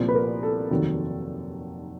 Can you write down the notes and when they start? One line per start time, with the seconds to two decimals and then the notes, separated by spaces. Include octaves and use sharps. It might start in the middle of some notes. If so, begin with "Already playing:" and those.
Already playing: C2 A#2 F3
0.09 B4
0.15 A#4
0.43 A4
0.70 F1 D#2 D#3 F#3